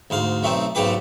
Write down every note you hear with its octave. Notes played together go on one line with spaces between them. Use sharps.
D2 G#2 F5
B1 A3 C4 D#4
B1 G#2 C#3 G4 B4